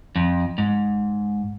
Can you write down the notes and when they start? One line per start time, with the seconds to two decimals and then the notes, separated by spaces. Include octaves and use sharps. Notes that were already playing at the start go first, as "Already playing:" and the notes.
0.16 F2
0.58 G#2